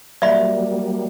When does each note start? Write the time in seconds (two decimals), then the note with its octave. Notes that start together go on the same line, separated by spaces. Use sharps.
0.22 F#3 G3 A#3 D5 E5 B5